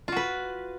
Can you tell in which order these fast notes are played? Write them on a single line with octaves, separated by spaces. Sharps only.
F4 F#4 B4